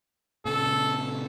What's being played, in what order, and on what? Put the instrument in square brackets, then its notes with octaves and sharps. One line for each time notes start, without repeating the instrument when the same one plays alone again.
[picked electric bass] A#2 C#3 [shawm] A4